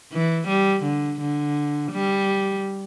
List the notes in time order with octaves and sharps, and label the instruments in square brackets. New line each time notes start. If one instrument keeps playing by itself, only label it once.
[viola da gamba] E3
G3
D3
D3
G3